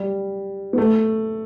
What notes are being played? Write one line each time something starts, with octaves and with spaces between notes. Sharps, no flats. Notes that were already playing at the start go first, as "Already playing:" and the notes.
Already playing: G3
B3
A3